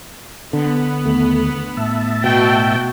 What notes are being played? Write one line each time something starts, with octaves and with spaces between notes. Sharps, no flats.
D3 B3
D#2 A3
A2 E5 A5
B2 F#4 G5